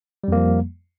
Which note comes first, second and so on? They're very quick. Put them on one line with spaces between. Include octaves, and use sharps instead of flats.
G3 F2 A#3 F3